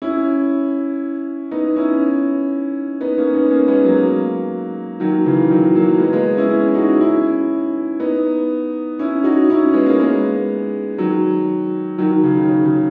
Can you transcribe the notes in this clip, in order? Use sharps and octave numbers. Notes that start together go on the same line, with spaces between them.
C#4 E4
B3 D#4
C#4 E4
B3 D#4
A#3 C#4
B3 D#4
A#3 C#4
G#3 B3
F#3 A#3
D#3 F#3
C#3 E3
D#3 F#3
F#3 A#3
G#3 B3
G#3 B3
C#4 E4
C#4 E4
D#4 F#4
C#4 E4
B3 D#4
C#4 E4
D#4 F#4
C#4 E4
G#3 B3
A#3 C#4
G#3 B3
D#3 F#3
D#3 F#3
D#3
C#3
D#3
C#3
C#3